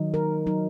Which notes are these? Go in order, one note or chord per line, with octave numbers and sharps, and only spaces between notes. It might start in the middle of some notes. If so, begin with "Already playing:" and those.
Already playing: D#3 F#3 D#4
A#4
F#3 D#4